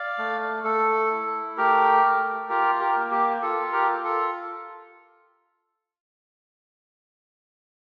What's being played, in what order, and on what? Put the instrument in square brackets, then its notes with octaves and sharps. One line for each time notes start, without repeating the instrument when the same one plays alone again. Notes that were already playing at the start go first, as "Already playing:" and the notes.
Already playing: [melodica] D5 F5
A3
A3 A4
E4
A3 G4 A#4
A3
F4 G4 A#4
G4 A#4
A#3
G4
F4 A4
G4 A#4
F4
A4